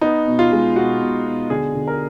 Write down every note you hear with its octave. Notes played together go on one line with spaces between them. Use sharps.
B3 D#4
B2
F4
G#3
B2 F#4
B2
B2
D3 G#4
D3
A#4